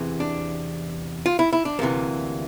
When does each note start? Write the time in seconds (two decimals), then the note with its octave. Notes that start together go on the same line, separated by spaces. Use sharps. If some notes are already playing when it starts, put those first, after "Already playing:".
Already playing: E2 C3 E3
0.20 D4
1.26 F4
1.39 E4
1.53 E4
1.65 D4
1.79 D2 C3 E3 A#3